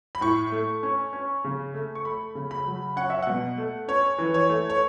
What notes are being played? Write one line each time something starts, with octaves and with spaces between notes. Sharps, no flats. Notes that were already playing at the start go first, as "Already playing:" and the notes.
B5
A2 C#6
A3
C#4
C#4
C#3
A3
C#6
A3 B5
C#3
B5
F#3
C#4 F#5
E5
B2 F#5
A3
C#4 C#5
E3
C#5
A3
C#5